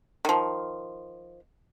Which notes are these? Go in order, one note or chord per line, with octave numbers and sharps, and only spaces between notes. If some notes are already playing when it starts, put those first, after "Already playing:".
D#3 F3